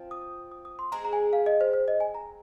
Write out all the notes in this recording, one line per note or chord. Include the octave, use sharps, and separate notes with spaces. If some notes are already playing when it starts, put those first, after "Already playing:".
Already playing: F3 C4
D#6
D#6
D#6
C6
G#3 C4 G#4 A#5
A#5
G#5
F5
D#5
C5
C5
D#5
G#5
A#5